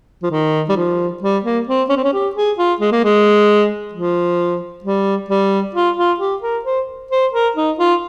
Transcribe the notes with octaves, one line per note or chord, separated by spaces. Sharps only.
F3
D#3
G3
F3
G3
A#3
C4
C#4
C4
C#4
G4
G#4
F4
G#3
A#3
G#3
F3
G3
G3
F4
F4
G4
A#4
C5
C5
A#4
D#4
F4